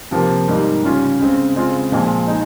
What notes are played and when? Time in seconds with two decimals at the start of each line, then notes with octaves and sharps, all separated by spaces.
0.11 C3 F3 A#3
0.48 G#2 G3 A#3 D#4
0.83 C#3 G3 C#4 F4
1.20 C#3 G#3 C4
1.55 C#3 G#3 C4 F4
1.92 A#2 F3 G#3
2.27 G#3 D#4